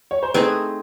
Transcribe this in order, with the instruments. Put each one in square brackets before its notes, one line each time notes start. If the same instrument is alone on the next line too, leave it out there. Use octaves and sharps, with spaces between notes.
[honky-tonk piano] C#5
C5
[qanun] A3 C4 D#4 G#4 [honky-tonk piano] B4